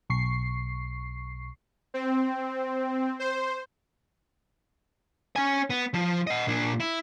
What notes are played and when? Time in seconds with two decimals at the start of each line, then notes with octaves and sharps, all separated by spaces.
0.10 B1 C#6 C7
1.94 C4
3.19 C5
5.36 C#4 G#5
5.70 B3
5.94 F3 F4
6.27 D#5 F#5
6.47 A#2 D4
6.80 E4